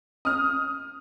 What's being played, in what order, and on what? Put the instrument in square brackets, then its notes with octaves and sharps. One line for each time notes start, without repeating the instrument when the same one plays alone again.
[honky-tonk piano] D#6 F6